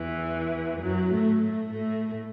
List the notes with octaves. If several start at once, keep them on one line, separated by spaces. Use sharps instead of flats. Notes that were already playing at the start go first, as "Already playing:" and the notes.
Already playing: E2 E3
F#2 F#3
A2 A3
A2 A3
A2 A3